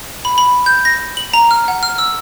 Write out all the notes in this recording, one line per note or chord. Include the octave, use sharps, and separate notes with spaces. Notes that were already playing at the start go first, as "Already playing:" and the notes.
B5
B5
G6
A#6
F#7
A#5
F6
F#5
F6
E6